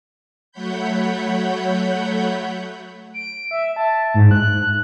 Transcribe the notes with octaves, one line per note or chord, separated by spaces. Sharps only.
F#3 A3 C#5 F#5 B5 G6
D7
E5
A5
G#2
F#6